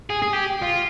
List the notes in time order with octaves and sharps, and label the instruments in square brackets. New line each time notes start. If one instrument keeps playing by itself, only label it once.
[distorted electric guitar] G#4
G#4
G4
F4